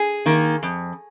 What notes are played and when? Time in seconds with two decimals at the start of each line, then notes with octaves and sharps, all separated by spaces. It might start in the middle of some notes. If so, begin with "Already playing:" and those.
Already playing: G#4
0.26 D#3 A#3
0.63 F2